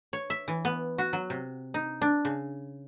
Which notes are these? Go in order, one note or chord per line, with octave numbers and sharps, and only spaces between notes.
C#5
E5
E3
B3
F#4
F#3
C3
D#4
D4
C#3